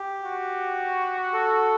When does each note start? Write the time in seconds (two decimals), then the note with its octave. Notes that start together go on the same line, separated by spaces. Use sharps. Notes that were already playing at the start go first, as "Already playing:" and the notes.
Already playing: G4
0.24 F#4
1.33 A4